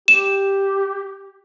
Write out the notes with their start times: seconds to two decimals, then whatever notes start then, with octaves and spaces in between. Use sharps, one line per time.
0.08 G4 E7